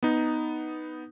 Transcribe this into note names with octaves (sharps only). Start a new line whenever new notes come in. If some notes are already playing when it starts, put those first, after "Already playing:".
B3 D#4